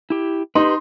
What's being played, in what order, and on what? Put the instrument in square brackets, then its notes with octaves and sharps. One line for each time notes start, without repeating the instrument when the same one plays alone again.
[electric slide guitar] E4 G4
[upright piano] D#4 [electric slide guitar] G4 B4 [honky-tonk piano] C6